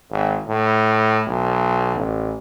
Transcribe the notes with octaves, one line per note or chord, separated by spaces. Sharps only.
G#1
A2
B1
A1